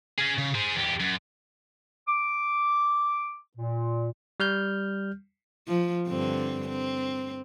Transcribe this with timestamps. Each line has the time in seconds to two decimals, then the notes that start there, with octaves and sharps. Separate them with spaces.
0.18 C#4 G#4
0.38 C#3
0.55 G#4 C5
0.75 E2 G4
1.00 F#2
2.08 D6
3.57 A#2
4.40 G3 F6 G6
5.67 F3
6.08 G2 D3 C4
6.68 C4